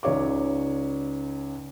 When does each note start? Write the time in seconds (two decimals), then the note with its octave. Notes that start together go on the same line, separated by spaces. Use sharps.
0.03 C#2 C#3 D#4 C#5 D5 D6